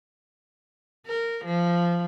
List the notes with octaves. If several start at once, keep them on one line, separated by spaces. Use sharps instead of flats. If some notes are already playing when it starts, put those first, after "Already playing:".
A#4
F3